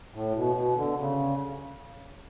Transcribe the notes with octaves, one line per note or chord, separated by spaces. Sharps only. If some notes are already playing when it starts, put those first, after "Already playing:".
A2
B2
B2
D3
C#3